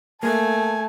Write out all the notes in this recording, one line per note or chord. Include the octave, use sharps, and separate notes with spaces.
A3 A#3 G#5 A5